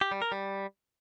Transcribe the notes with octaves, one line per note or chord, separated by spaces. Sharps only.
G4
G3
A#4
G3